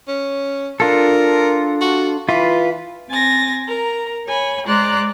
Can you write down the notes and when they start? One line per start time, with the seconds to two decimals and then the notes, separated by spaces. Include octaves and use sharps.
0.08 C#4
0.80 D4 F4 A4 A#4
1.81 F#4
2.29 E3 F4 B4
3.09 C4 G#5 A6 A#6
3.67 A#4 A#5
4.27 C#5 G#5 B5
4.66 G#3 C5 D5 A#5 F#6